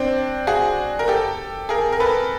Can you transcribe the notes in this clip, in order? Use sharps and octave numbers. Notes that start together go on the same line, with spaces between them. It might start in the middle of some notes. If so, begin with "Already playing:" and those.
Already playing: C4 D4
F#4 G#4
A#4
G4 A4
G#4 A#4
A#4
A4 B4